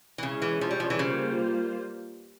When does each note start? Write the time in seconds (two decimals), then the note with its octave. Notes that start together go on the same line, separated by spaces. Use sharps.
0.18 E3
0.23 C#3 G#3 C#4 E4 G#4 C#5
0.42 E3
0.61 F3
0.71 G3
0.80 F3
0.90 E3
0.99 C#3 G3 A#3 F4 C5